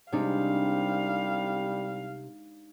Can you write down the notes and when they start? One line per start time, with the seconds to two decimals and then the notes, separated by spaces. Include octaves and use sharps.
0.12 C2 C3 G3 G#3 D4 D#4 F5